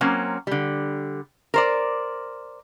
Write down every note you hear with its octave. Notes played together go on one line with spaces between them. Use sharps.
F#3 A#3 C4 C#4
D3 G3
A#4 C5 D5